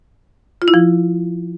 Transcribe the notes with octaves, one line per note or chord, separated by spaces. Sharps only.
F4
E4
F3